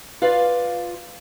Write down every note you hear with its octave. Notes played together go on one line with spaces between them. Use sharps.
F4 B4 D5 F5